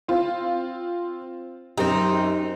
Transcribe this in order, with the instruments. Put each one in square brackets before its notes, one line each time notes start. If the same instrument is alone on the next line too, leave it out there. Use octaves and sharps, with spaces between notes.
[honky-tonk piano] C4 F4
[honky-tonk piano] F#2 G4 [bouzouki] C4 D#4